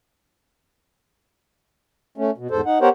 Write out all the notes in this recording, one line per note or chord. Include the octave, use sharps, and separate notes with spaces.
A3 C#4
B2
E2 G#2 A4 C5
D#4 F#5
B3 G4 A#4 C5 C#5 F#5